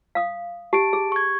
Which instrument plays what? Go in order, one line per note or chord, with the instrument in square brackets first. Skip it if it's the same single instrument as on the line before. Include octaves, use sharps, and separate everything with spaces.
[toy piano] F5 D#6
[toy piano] G4 [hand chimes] A5 D7
[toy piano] G#4
[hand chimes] C#6 G#6